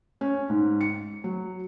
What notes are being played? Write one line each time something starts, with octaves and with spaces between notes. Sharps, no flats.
C#4
G#2
C#7
F#3